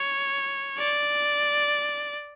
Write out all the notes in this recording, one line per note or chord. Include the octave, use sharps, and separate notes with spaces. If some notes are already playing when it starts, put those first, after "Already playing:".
Already playing: C#5
D5